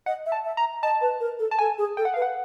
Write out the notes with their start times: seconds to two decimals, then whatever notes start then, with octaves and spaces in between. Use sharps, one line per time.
0.06 D#5 F#5
0.26 E5
0.32 A5
0.45 E5
0.57 A#5
0.83 D#5 A5
1.01 B4
1.20 A#4
1.39 A4
1.51 A5
1.59 A4 G#5
1.78 G#4
1.97 A4 G5
2.05 F#5
2.14 B4 F5
2.22 F#5